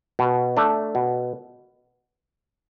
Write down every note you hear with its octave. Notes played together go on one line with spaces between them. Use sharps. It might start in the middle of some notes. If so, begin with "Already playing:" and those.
B2
A3 D4
B2